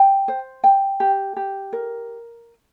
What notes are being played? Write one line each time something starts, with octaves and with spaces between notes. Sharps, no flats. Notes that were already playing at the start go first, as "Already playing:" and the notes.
Already playing: G5
C5
G5
G4
G4
A#4